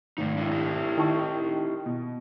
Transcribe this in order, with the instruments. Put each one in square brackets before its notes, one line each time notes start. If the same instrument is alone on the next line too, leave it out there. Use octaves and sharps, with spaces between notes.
[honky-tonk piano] G#1 [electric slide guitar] A3 D#4
[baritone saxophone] A2 [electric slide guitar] G#3 D4
[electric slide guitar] E4 G4
[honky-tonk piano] D#3 A5 C#6
B2